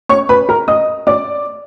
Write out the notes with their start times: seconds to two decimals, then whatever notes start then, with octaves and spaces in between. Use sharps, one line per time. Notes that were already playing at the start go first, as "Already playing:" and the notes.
0.09 C#5 C#6
0.29 B4 B5
0.49 A#4 A#5
0.68 D#5 D#6
1.07 D5 D6